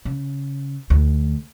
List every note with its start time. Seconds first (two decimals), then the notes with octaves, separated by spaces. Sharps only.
0.05 C#3
0.90 D2